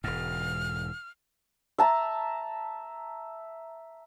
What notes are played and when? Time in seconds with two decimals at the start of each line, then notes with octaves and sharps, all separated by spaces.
0.04 E1 G#2 F6
1.78 E5 A5 A#5